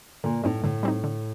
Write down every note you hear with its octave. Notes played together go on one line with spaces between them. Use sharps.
A#2 D3
A2 G3 C4 D#4
A2 D3
G3 C4 D#4
D3